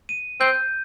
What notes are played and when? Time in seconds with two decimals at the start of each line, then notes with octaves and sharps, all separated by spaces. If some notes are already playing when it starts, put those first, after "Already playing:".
0.09 D#7
0.40 C4 G6